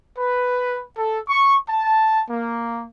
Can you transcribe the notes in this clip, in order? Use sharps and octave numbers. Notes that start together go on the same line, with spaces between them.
B4
A4
C#6
A5
A#3